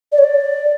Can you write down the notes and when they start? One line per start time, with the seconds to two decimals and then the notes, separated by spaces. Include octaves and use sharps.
0.12 D5
0.18 C#5
0.24 D5